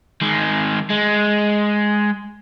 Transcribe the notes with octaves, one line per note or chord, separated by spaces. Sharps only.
D#3 G#3
G#3